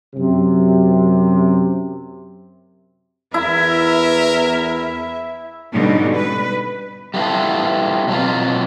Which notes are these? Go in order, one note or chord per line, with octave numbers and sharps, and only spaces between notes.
F#2 C3
E2 E4 A#4 E5
G#2 B2 D3 G3 C#4 D#4
B4
G3 A3 B3 E4 F4 A4
B2 F#3 C4 F4